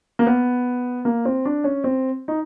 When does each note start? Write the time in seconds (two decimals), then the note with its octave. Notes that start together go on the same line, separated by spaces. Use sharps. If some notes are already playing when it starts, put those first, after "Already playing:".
0.19 A#3
0.27 B3
1.05 A#3
1.25 C4
1.45 D4
1.64 C#4
1.84 C4
2.28 D#4